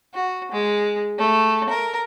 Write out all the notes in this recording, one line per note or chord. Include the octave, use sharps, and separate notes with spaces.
F#4
G#3
A3
A#4